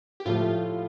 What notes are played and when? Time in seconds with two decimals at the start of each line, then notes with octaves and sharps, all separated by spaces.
0.20 G4
0.26 A2 F3 A3 F4